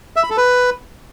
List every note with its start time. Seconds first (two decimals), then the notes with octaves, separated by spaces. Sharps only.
0.16 E5
0.23 B5
0.30 A4
0.37 B4